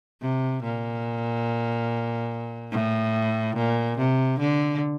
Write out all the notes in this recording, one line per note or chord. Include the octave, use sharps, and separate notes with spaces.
C3
A#2
A2
A#2
C3
D3